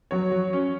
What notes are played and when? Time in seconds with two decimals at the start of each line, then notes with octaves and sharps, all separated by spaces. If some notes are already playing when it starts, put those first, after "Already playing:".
0.11 F#3 C#5
0.32 F#3
0.53 C#4